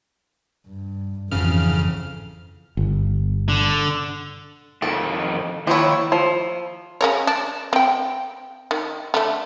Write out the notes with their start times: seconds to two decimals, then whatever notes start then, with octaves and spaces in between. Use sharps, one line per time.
0.67 G2
1.32 G#1 F2 C#3 E3 F6
2.77 G1
3.49 D3
4.82 F2 D#3 A4
5.67 D#2 F3 E4 C#5
6.12 F3
7.01 C#3 A#4 C#5
7.27 D4
7.73 C4 G5
8.71 D#3
9.14 D3 A3